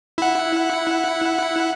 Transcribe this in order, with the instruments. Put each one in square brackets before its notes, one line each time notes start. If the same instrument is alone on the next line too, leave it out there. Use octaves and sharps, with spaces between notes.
[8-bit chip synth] E4 F#5